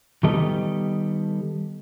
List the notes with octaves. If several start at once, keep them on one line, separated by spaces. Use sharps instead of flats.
D#3 G3 B3 G4 A4 D#5